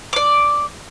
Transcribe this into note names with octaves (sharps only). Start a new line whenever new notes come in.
D5 D6